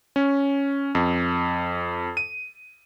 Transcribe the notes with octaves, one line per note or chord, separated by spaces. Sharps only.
C#4
F2
D#7